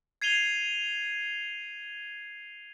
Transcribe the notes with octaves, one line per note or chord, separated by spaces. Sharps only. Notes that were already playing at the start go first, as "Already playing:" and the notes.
G#6 C7 D#7 F7 G7